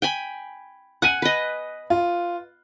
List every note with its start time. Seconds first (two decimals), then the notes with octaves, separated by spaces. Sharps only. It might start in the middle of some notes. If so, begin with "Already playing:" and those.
0.02 G5 G#5 B5
1.02 F#5 G#5 F#6 D#7
1.22 B4 D#5
1.90 F4